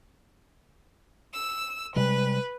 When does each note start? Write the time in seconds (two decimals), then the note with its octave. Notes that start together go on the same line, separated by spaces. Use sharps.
1.33 E6
1.96 C3 G3 G#3 B4